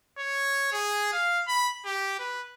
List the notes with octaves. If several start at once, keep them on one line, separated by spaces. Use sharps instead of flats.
C#5
G#4
F5
B5
G4
B4